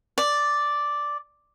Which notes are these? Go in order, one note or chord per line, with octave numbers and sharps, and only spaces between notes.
D5